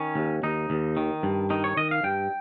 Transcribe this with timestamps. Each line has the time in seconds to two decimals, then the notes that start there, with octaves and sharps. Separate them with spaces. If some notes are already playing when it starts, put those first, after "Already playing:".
Already playing: D#3 C#4
0.16 D#2
0.43 D#2 D#4
0.70 D#2
0.97 D#3
1.23 G2
1.50 D#3 D#4
1.64 C#5
1.77 D#3 D#5
1.91 F5
2.04 G2 G5